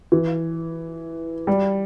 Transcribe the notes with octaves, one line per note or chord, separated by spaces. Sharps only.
E3
G3